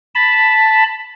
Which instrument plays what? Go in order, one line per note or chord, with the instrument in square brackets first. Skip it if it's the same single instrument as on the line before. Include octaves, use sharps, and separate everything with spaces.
[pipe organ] A5 B5